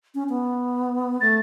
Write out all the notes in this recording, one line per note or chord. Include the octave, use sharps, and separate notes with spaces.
C#4
B3
A3 A6